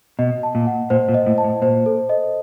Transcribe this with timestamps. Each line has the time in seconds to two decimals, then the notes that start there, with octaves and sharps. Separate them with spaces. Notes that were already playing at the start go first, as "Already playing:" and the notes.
0.19 B2 D#5
0.43 A5
0.55 A#2
0.67 F#5
0.90 A#2 C5
1.09 A#2
1.14 D#5
1.26 A2
1.38 A5
1.44 A2
1.62 A#2 C5
1.86 A4
2.09 D#5